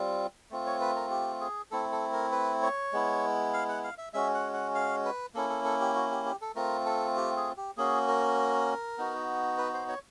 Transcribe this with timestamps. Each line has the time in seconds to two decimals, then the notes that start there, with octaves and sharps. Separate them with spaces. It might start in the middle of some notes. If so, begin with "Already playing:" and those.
Already playing: G3 C4 F4
0.51 A3 C4 F4
0.66 C#5
0.81 B4
0.96 A#4
1.11 G4
1.41 G#4
1.71 A3 C4 E4 A4
1.92 A4
2.13 A#4
2.32 B4
2.62 C#5
2.93 G#3 B3 E4
3.53 F5
3.69 F#5
3.84 F5
3.98 E5
4.14 G#3 C#4 F#4 E5
4.34 F#5
4.53 F#5
4.75 F5
5.05 B4
5.34 A#3 C#4 E4 A4
5.50 A4
5.64 A4
5.81 G4
5.95 F#4
6.11 G4
6.26 G4
6.41 A4
6.55 A3 C4 F4 A#4
6.86 A4
7.16 G4
7.36 G#4
7.57 G4
7.77 A#3 C#4 F#4 G#4
8.08 A#4
8.98 B3 D#4 F#4
9.58 B4
9.74 C5
9.88 C#5